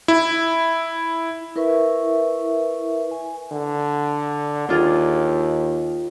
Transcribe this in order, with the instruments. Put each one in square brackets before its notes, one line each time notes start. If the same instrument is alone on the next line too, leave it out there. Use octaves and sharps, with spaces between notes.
[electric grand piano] E4
[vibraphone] E4 A#4 B4 E5 C#6
G#5
[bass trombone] D3
[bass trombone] D#2 [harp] D4 F4 G#4